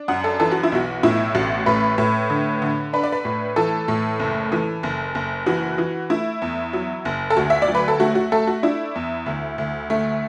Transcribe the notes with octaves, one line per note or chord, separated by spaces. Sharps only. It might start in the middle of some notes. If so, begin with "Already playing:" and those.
Already playing: D4
F#2 F#5
A4
E3 A4
F#4
E4
B1 F#4
A2 E4
A1 F#4
A2 B4
A2
D3
D3
D4 B4
D5
B4
A2
E3 A4
A2
F#1
E3
F#1
F#1
E3 F#4
E3
A3 E4
E2
F#3
F#1
A4
D2 F#4
E5
D5
F#3
B4
A4
A3 F#4
F#4
A3 A4
F#4
D4 E4
E2
D2
D2
A3